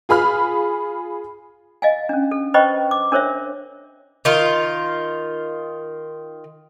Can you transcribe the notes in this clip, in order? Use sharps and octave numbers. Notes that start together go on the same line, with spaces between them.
F4 G#4 B5 F6
D#5 F5 G#5
C#4 D4
A4
B4 C5 D#5 G5 B5 C#6
D6
D4 A#4 C5 C#5 E5
D#3 F4